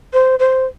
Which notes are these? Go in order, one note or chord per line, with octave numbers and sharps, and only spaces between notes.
C5
C5